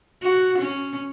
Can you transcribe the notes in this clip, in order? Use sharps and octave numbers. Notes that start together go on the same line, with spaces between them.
F#4
C#4